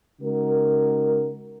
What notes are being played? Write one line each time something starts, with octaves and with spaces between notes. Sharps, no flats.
C#3 G#3 D#4 F#4 A#4